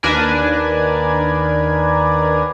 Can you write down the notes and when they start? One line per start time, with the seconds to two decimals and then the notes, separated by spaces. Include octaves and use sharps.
0.03 D#2 D4 A#4 B4 G#5